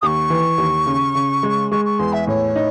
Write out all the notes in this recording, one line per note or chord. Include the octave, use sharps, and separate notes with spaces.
D#2 C#6 D#6
E3
D#2
C#3
C#3
G#3
G#3 C#6
C#6
E2 C6
E5
A2 C#5
D#4